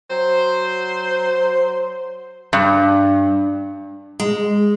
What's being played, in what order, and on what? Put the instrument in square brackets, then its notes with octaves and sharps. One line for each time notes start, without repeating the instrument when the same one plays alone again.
[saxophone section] F#3 C5
[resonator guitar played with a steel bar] G2
[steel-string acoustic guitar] G#3